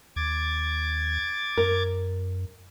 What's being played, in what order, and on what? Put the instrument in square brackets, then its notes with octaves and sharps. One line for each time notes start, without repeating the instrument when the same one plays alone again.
[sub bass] D#2 [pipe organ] D6 G#6 A6
[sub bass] F#2 [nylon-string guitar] A#4